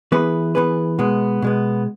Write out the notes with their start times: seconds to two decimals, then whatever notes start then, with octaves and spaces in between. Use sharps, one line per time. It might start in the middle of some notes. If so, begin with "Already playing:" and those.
0.12 E3 B3 G#4 B4
0.55 E3 B3 G#4 B4
0.98 B2 G#3 B3
1.42 B2 G#3 B3